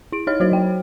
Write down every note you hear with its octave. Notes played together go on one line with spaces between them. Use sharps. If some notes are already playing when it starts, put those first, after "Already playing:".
E4 D7
D#4 C#5 D#5 F6
F#3 F#4 C5 C#5
F#3 G5